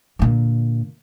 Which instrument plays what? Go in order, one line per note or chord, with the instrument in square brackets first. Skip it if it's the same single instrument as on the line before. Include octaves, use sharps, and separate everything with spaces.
[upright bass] A#2 D3